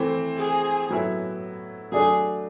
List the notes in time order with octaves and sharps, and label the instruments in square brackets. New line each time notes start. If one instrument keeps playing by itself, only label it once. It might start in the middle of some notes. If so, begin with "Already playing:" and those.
Already playing: [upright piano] E3 A3 C4
[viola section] G#4
[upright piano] A2 F#3 B3 E4
[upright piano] F#3 A3 D4 [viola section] G#4